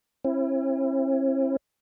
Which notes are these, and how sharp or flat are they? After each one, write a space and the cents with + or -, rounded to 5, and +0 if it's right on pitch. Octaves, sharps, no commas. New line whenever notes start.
C4 +45 E4 +15